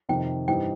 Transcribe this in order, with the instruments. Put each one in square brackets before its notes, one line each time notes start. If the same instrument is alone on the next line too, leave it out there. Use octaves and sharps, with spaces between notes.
[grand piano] F2 C3 D#3 [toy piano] G5
[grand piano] G2 E3 G3 C4 D#4 [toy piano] G5